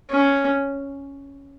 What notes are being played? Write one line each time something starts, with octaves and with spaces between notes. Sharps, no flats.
C#4